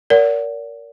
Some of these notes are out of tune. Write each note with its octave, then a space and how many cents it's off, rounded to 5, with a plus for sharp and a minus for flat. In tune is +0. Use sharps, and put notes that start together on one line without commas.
A#4 +0 D5 -40 F#5 +0